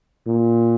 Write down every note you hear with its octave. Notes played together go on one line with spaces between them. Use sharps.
A#2